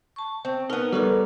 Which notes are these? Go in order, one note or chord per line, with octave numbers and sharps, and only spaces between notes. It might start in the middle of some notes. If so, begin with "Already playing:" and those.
A5 C#6
C4
B3 D#4 A#4
G3 A4 B4 C#5